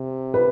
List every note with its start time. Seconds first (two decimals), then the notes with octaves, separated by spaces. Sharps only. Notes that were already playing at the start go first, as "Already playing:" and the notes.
Already playing: C3
0.34 B4